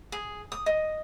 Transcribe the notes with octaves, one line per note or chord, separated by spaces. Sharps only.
G#4
D#6
D#5